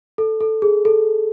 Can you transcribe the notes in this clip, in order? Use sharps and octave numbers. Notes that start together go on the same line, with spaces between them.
A4
A4
G#4
A4